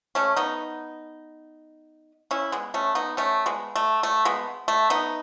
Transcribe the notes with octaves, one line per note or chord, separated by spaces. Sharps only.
A3 C#4
B3 D#4
C#4 E4
G#3 B3
A3 C#4
B3 D#4
A3 C#4
G#3 B3
A3
A3
G#3 B3
A3
B3 D#4